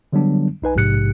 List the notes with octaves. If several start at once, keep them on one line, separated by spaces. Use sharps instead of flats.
D3 F#3 G3 B3 D4
B1 D#4 B4 G#5
A#1 G#2 C3 G4 F#6 C#7